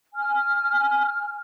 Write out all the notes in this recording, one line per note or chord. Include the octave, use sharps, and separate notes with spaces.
G#5 F6